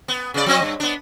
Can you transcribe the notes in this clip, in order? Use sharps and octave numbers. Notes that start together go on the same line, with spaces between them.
B3
C#3 B3 D5
F3 C4 D#5
G2
B3 D4